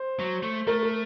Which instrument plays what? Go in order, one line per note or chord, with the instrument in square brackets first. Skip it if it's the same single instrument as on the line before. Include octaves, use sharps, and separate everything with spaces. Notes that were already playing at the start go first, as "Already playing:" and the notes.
Already playing: [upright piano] C5
[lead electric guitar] F#3
A3
[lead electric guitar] A3 [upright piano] A#4
[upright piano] A#4